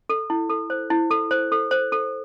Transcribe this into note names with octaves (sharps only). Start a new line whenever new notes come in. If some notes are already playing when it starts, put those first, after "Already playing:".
A4
E4
A4
C5
E4
A4
C5
A4
C5
A4